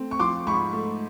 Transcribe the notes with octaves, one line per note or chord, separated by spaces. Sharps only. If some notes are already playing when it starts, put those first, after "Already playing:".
Already playing: A3 C4
C#6
F3 C6 D6
G#2 B5 C#6
A3